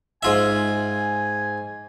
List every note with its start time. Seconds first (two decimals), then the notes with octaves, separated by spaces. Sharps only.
0.23 G#2 F4 E5 G#5